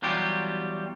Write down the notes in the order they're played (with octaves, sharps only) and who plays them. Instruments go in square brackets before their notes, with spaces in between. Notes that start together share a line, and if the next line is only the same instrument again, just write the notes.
[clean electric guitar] E2 F#3 G3 F4 G4